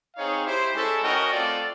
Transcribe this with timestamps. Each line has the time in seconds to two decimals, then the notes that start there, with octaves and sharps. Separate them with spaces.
0.16 C4 D#4 G#4 C#5 F5
0.45 E4 G4 C5
0.74 G#3 C#4 E4 A4
1.02 C#4 F#4 A#4 D#5 G5
1.31 A3 C4 F4 A4 D5